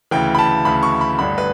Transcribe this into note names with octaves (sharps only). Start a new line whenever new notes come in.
D2 C#3 E3 G5
B5
A5
D2 C#3 E3 B5
C#6
B5
A1 G2 D3 B5
B4